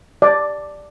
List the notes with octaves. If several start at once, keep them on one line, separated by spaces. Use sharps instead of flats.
D5